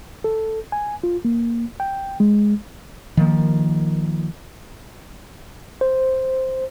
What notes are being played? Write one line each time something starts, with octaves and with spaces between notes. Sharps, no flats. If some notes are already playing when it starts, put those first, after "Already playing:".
A4
G#5
F4
A#3
G5
G#3
D#3 F3 A#3
C5